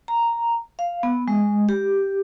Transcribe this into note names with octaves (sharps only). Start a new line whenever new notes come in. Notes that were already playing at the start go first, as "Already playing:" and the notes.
A#5
F5
B3
G#3
G4